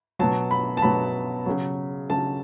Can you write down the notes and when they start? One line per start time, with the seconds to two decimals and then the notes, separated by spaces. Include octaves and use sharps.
0.19 B2 F#3 A5
0.51 B5
0.77 A5
0.82 B2 F#3 B5
1.46 C#3 F#3
2.10 C#3 F#3 A5